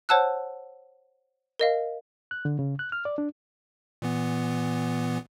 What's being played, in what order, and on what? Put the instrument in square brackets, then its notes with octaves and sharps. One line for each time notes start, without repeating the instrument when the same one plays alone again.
[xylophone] C5 C#5 F#5 A5 E6 F#6
A#4 D#5 F5
[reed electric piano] F#6
D3
C#3
F#6
F6
D5
D4
[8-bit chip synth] A#2 E3 B3